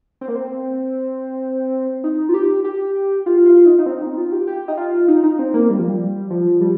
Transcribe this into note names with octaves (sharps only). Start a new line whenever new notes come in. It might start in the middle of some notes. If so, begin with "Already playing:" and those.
C4
A#3
C4
D#4
F4
G4
G4
F4
F4
D#4
D#4
C4
D#4
F4
G4
G4
D#4
F4
D#4
D#4
C4
A#3
G3
F3
G3
F3
G3